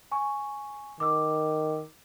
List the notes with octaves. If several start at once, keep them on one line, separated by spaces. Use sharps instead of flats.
G#5 C#6
D#3 D6 E6